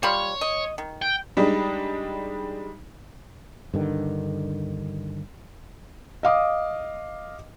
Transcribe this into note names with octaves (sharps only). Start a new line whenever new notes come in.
G3 F4 C#5 B5
D#5
D#3
G5
G3 G#3 D4 D#4
G2 D3 D#3
D#5 F5 D6 D#6